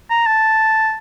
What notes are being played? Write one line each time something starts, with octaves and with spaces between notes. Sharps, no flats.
A#5
A5